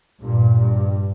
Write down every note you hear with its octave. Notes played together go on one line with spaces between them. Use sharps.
G2 A#2
G2